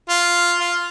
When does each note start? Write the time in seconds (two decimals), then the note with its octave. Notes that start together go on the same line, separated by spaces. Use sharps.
0.09 F4
0.60 F4